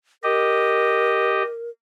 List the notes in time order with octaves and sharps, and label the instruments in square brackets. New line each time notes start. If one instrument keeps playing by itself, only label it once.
[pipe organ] G4 D#5 [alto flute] A#4